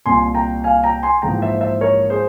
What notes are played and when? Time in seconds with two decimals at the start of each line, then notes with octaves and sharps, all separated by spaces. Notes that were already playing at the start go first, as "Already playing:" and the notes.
0.06 C2 A#2 G#5 C6
0.34 G5 A#5
0.64 F5 G#5
0.84 G5 A#5
1.03 G#5 C6
1.22 A#1 G#2 E3 G5 A#5
1.42 C5 E5
1.61 C5 E5
1.81 A#4 C#5
2.10 G#4 C5